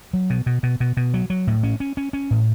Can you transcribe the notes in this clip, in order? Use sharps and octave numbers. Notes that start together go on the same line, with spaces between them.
F#3
B2
B2
B2
B2
B2
F#3
F#3
A2
C#4
C#4
C#4
C#4
A2